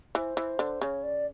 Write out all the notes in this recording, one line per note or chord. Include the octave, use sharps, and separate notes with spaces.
E3 C5
E3
D3
C#3 C#5 D5
D5